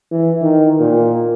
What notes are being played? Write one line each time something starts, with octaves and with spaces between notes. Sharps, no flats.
E3
D#3
A#2